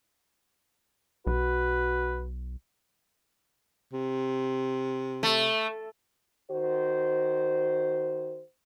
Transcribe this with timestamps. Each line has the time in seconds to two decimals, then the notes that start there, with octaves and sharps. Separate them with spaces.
1.27 B1 F#4 B4
3.93 C3
5.23 A3
6.51 D#3 F#4 C5